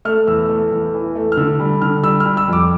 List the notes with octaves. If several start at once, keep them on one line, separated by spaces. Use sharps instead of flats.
A3 F6
E2 E6
A3
E2
E3
A3
F6
D3 E6
G3
D3 F6
G3 E6
F6
G3
E6
F2 D6